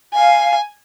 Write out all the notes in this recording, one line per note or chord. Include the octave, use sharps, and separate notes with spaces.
F5 G#5